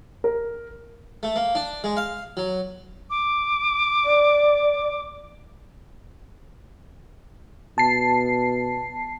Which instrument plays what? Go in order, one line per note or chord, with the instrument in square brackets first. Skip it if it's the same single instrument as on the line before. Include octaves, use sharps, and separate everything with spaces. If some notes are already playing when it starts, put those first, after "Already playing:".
[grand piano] A#4
[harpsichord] A3
A#3
D4
G#3
F5
F#3
[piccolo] D6
[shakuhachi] D5
[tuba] B2 [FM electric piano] A5 C7